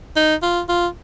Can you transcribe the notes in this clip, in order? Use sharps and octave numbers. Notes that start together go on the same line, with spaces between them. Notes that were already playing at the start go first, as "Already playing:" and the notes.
D#4
F4
F4